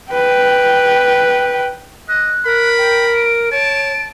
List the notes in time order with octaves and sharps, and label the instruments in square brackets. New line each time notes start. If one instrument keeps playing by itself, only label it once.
[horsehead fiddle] B4 G5
[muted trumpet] D#5 [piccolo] F#6
[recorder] A#4 [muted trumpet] B5
[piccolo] G5
D7
[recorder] C#5 [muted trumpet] A5